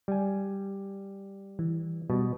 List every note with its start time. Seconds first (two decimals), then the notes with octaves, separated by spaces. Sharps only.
0.08 G3 G#5
1.59 E3
2.10 B2 G3